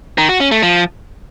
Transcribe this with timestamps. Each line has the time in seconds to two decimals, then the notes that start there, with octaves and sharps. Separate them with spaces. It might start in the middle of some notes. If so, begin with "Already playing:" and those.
0.18 D#3
0.29 F#4
0.40 C#4
0.51 A3
0.63 F3